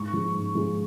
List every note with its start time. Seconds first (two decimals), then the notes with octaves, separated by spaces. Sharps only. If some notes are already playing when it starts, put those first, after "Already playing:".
Already playing: G#2 C#6
0.13 F3 G#3
0.34 G#2
0.55 F3 G#3